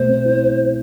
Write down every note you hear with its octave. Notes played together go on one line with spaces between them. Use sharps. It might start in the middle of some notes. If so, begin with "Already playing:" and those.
Already playing: B2 A3 C5
C4
E4